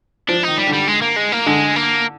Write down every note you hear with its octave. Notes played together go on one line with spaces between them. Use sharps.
F3 D4
D#3 D#4
G3
D3
G3
G#3
A#3
G#3
A#3
D3 G#3
A#3